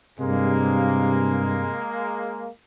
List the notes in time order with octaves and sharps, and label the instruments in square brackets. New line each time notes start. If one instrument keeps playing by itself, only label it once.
[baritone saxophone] G2 [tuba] C3 [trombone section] G#3 A#3